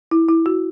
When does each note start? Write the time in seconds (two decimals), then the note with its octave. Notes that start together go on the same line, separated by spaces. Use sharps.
0.11 E4
0.28 E4
0.46 F#4